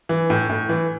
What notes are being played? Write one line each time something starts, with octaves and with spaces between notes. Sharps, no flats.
E3
A2
A2
E3